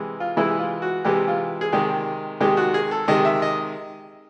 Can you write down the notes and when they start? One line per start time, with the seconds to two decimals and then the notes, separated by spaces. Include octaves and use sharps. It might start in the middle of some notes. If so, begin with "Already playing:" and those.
Already playing: C3 E3 G#3
0.20 F4
0.36 C3 E3 G#3 E4
0.59 F4
0.82 F#4
1.05 C3 E3 G#3 G4
1.28 F4
1.61 G#4
1.72 C3 D#3 G#3 G4
2.40 C3 D#3 G#3 G4
2.57 F#4
2.74 G#4
2.91 A4
3.08 C3 D#3 G#3 D#5
3.25 E5
3.42 D#5